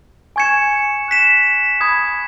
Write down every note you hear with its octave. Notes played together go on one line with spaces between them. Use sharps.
G#5 C#6 G#6 C#7 E7
F#6 B6 E7
B5 D#6 G#6